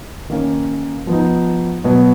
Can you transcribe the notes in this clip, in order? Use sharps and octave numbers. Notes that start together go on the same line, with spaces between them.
D#3 A#3 C#4
F3 B3 D#4
B2 F#3 B3